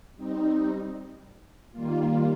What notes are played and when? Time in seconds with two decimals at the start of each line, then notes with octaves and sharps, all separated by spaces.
0.16 G3 C4 D#4
1.71 D#3 G3 A#3 F4